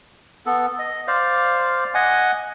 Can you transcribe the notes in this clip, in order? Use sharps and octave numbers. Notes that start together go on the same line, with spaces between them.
B3 A4
D#5
C5 D5 F5
D#5 F#5 G#5